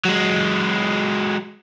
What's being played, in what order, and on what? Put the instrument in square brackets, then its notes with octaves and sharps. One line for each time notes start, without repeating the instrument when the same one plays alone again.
[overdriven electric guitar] F#3 G#3